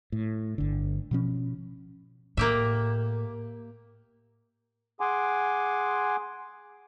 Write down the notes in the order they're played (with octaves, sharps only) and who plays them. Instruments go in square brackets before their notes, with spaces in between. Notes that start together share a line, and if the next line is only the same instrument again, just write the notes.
[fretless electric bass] A2
G1 D3
B2 F3 C#4
[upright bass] A2 [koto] A#3 G4 E5
[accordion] G#4 F#5 G#5 C6 D6